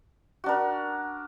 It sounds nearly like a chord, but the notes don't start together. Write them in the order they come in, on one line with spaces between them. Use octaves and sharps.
F#4 D4 A#4